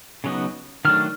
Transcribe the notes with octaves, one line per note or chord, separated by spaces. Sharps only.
C#3 F#3 B3 D#4
D#3 F#3 A3 D4 F6